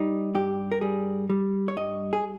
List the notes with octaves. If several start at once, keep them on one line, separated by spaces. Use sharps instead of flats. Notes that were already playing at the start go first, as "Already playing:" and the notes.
Already playing: G3 D#4
G2 G4
A#4
G3 G#4
G3
C#5
G2 D#5
G#4